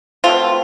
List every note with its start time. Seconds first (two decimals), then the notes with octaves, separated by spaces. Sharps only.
0.24 B2 A3 C4 F4